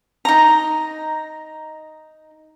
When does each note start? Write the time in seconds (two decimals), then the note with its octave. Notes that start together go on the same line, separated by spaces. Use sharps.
0.25 D#4 A#5